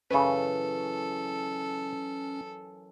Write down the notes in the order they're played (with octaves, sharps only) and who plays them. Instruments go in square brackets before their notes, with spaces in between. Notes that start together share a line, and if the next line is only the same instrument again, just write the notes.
[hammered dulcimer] F#2 E3 C#6 [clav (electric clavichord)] C#3 B4 [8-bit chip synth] C#4 [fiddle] A4